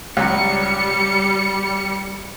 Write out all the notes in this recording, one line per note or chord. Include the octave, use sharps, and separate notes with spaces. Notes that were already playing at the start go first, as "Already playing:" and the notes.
C#2 F#3 G3 C#7